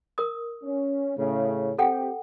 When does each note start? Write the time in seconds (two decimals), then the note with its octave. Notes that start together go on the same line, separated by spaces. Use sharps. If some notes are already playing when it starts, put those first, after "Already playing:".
0.18 A#4 D#6
0.62 C#4
1.17 A2 C#3
1.78 C4 G4 A4 F#5 G5